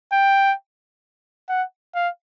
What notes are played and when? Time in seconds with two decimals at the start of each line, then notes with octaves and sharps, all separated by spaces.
0.12 G5
1.49 F#5
1.95 F5